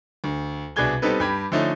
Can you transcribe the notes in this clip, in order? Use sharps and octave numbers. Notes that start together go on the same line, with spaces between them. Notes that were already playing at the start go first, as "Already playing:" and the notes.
D2
C2 B2 D4 G#4 G#6 G7
G3 B3 C4 D#4 A4 B4
G2 G4 B5 G#6
D3 F3 A3 C#4 D#4